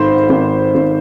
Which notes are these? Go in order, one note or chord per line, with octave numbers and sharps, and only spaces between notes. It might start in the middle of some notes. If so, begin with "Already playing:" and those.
Already playing: G#1 G#2 C5 B5 C6
G#1
G#1